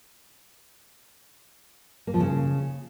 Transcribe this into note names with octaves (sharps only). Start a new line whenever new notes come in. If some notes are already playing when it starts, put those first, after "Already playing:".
A#3
F3
C#3